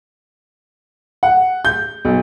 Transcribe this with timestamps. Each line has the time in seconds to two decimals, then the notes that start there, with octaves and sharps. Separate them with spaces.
1.23 F#5
1.65 G6
2.05 B1